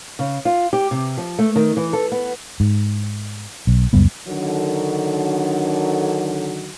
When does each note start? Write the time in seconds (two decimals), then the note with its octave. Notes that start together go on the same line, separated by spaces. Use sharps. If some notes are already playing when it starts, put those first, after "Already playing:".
0.19 C#3
0.45 F4
0.73 G4
0.91 C3
1.17 F3
1.39 A3
1.56 D#3
1.77 E3
1.93 A4
2.12 B3
2.60 G#2
3.67 B1
3.93 C#2 F#2 G3 B3
4.28 D3 D#3 F#3